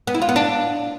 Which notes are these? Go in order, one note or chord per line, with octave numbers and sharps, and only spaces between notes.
B3
E4
F4
B3
D4